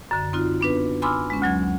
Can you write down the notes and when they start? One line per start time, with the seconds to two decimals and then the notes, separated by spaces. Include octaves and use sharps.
0.11 F#2 D3
0.33 C4 D#4 F4 F#4
0.61 B3 D4 B4
1.02 G#5 B5 C6 D6 E6 F6
1.30 G#3 C#4
1.42 D2 F#3 G#6